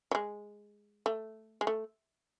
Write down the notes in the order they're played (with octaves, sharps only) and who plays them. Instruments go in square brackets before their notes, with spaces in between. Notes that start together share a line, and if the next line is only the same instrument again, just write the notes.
[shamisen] F#3
G#3
A3
G#3
A3